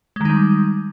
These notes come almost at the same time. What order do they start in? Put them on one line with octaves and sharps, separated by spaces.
G#3 D#3 D#4 G3